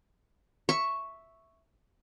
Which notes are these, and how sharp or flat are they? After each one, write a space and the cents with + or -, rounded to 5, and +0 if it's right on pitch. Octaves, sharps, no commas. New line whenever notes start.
E5 +0 C#6 +0